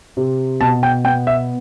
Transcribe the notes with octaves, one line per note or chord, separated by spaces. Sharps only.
C3
B2 A5
G5
B3 G5
E5